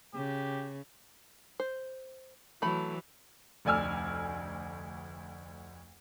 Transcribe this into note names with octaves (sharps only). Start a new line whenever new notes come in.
C#3 G4
C5
E3 F#3 A3 B5
F1 D2 D5 G#5 E6 F6